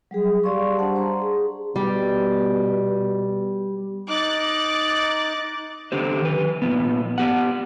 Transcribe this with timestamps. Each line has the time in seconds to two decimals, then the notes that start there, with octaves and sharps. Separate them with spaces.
0.11 F#3 G3 G#4
0.44 G3 G4 D5 F5 C6 C#6
0.78 D4 C5 F#5 A5
0.96 C5 A#5 C6
1.22 G#4
1.76 B2 G3
4.09 D#4 D6 F#6 A6
5.92 D3 G4 C5
6.22 D#3 B4
6.62 A#2 F3 B3
7.18 B3 G4 F#5